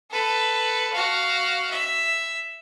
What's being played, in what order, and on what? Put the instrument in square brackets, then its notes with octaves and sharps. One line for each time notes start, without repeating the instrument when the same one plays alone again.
[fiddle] A4 B4
F#4 F5
E5